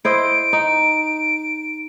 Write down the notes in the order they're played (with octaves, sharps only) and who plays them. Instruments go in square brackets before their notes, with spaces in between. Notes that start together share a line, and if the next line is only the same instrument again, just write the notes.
[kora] E4 C5 D#5 [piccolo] D7
[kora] D#4